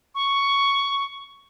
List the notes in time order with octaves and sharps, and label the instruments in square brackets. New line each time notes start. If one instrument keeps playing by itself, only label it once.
[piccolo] C#6